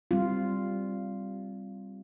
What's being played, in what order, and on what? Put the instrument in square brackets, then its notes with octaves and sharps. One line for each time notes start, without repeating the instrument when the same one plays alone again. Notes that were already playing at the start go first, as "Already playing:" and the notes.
[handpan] G3 C4 F4